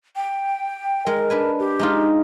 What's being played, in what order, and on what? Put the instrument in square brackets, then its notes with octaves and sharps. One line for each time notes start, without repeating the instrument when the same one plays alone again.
[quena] G5
[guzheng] G#3 [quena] A#4
[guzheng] D4 B4 G#5
[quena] G4
[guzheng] G#3 D#4 F4